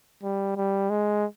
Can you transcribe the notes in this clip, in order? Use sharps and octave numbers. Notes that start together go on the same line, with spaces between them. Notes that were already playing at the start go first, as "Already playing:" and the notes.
G3
G3
G#3